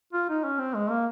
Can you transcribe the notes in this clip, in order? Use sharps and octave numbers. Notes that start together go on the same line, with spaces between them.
F4
D#4
C#4
C4
G#3
A#3